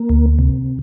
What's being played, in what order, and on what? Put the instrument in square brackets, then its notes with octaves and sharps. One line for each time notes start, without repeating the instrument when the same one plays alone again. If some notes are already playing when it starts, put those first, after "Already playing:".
Already playing: [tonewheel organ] A#3
D2
C3